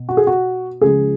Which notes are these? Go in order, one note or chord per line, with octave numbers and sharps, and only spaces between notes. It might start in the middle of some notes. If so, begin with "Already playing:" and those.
Already playing: B2
F#4
G#4
F#4
C#2 C#3 F3 G#3 G#4